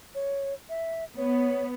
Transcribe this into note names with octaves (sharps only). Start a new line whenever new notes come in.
C#5
E5
B3 C#5